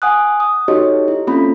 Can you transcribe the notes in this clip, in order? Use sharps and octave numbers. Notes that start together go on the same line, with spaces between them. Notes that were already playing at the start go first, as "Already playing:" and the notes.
F#5 G#5 D#6 F#6
D#6
D#4 F#4 G4 A4 C#5 D#5
E4
A#3 C4 C#4 F4 A4 B5